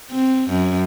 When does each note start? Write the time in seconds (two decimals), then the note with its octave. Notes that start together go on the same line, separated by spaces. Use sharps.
0.11 C4
0.50 F#2